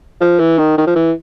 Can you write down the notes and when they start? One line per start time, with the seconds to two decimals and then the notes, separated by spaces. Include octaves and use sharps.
0.21 F3
0.39 E3
0.58 D#3
0.78 D#3
0.87 F3
0.96 E3